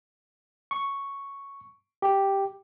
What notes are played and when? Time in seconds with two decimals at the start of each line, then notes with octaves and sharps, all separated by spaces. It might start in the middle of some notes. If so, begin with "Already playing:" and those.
0.71 C#6
2.02 G4